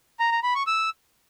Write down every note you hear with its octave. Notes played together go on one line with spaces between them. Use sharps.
A#5
A#5
B5
C#6
E6